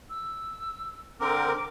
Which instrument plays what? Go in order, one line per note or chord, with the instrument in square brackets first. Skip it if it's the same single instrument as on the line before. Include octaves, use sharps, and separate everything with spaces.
[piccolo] E6
[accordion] D3 C4 A#4 [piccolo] D6